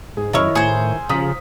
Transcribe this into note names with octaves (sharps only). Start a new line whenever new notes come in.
G#2 G#4
F#2 D#3 E4 C#5 D#5 E6 F6
A2 G#4 C5 D#6 G#6 C#7
C#3 F3 A#5 D#6 B6